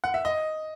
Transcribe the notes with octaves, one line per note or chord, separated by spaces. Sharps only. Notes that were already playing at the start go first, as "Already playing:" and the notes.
F#5
E5
D#5